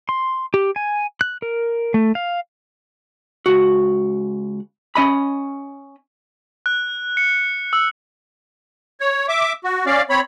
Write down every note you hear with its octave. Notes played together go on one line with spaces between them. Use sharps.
C6
G4
G#5
F#6
A#4
A3
F5
C#2 F#4
C#4 D#5 B5
F#6
C#7
E6
C#5
E5 D6
F#4
C#4 D5 F5
C4 C#5 B5